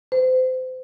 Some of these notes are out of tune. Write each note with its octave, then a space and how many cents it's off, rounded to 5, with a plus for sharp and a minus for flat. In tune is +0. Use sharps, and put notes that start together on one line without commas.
C5 -30